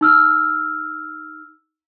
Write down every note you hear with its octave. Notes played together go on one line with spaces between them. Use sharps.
D#4 E6 F6